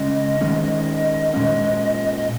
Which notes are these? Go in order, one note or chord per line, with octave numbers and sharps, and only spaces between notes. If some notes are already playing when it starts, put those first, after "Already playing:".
Already playing: C#3 G#3 C#4 D#5
D#3 G#3 C#4
A#2 G#3 C#4
D#5